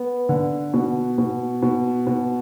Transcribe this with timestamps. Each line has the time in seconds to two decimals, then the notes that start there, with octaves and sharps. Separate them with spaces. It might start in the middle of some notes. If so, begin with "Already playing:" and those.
Already playing: B3
0.29 D3
0.74 B2
1.18 B2
1.62 B2
2.07 B2